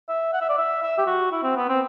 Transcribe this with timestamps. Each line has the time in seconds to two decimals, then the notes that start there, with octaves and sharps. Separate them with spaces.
0.09 E5
0.33 F#5
0.41 E5
0.50 D5
0.58 E5
0.83 E5
0.98 G4
1.07 F#4
1.32 E4
1.43 C4
1.57 B3
1.69 C4